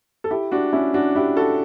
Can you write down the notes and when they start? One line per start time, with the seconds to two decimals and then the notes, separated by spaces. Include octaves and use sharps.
0.24 A4
0.31 E4 G4
0.51 D4 F#4
0.73 C#4 E4
0.94 D4 F#4
1.15 E4 G4
1.37 F#4 A4